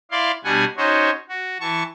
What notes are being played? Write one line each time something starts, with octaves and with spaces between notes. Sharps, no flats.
E4 D5 F5 C6
B2 G3 D4 F#5 G#5
C#4 D#4 F#4 C5 C#5
F#4
E3 A5 C#6